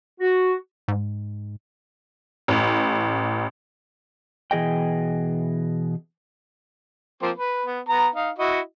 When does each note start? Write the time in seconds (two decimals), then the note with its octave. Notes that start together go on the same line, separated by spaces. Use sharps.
0.20 F#4
0.88 G#2
2.48 A1
4.51 B2 E3 G#4 D#5 G5
7.22 F3 A#3 C4
7.36 B4
7.66 B3
7.89 B3 A#5
8.15 D#4 F5
8.39 E4 F#4 D#5